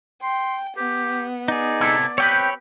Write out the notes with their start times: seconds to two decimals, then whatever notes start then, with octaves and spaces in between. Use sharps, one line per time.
0.23 G5 C6
0.77 B3 G4
1.48 D#4 G#4 D5
1.81 C3 E4 A4
2.18 C4 G4 B4 C#5 G5 B5